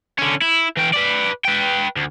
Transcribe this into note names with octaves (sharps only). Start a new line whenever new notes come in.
D3 C#4
E4
E3 G5
B4 D5
B4 G5
D2